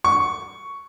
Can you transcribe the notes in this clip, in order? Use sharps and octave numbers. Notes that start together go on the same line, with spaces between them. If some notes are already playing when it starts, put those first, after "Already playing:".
C#6